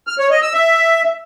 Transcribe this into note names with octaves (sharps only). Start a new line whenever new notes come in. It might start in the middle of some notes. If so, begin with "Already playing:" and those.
F6
C#5
D#5
E6
E5